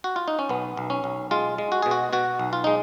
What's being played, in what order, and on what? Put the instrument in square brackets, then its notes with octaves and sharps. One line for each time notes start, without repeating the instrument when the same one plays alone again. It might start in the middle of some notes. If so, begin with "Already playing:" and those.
[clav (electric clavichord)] F#4
F4
D#4
C#4
B1 B3
B1
C#4
B1
G#3 F4
G#3
F#4
B2 G#4
F#4
B2 F#4
B1
F4
G#3 D#4